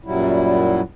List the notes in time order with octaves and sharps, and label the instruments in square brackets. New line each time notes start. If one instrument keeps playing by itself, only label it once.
[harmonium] F#2 A#2 F#3 G3 E4